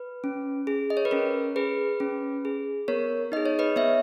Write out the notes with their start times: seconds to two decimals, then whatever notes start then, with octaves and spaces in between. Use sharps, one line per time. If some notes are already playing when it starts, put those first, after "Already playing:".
Already playing: B4
0.24 C#4
0.67 G#4
0.90 D#5
0.97 C#5
1.05 B4
1.11 C#4 A#4
1.56 G#4 B4
2.00 C#4
2.45 G#4
2.88 B3 A#4 C#5
3.32 D#4 G#4 D#5
3.46 C#5
3.59 B4 D#5
3.76 B3 C#5 E5